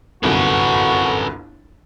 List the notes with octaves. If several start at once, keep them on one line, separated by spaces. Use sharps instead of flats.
G1 C2 F#2 F#4 A4 B4